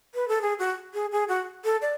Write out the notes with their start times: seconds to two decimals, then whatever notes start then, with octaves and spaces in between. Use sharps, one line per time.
0.15 B4
0.28 A4
0.41 G#4
0.59 F#4
0.94 G#4
1.12 G#4
1.28 F#4
1.65 A4
1.82 D5